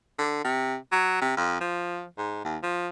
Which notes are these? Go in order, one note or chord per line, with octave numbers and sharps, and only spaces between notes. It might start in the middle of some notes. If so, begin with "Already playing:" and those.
D3
C3
F#3
C3
F2
F3
G#2
D#2
F3